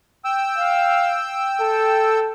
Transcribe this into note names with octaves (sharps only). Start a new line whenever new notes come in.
G5 E6
F5
A4